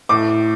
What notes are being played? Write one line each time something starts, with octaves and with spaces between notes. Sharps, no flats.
A2 D6